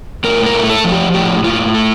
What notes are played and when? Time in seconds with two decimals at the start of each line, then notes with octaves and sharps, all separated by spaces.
0.24 A2 A#4
0.46 A#4
0.54 A3
0.70 A4
0.84 F3
0.92 G4
1.14 A2 G4
1.44 A2 F4
1.74 A3